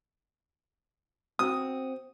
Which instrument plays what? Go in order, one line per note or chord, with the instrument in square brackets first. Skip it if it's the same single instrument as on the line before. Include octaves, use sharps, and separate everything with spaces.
[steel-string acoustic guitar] C4 F#4 [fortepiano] D#6